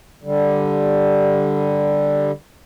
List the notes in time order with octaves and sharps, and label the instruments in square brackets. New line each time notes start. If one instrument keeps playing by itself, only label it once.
[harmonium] D3 G3